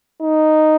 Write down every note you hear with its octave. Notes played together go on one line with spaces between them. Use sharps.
D#4